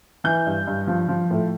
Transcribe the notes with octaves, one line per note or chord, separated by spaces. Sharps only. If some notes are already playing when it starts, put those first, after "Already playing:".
E3 G6
G2
G2
F3
F3
A2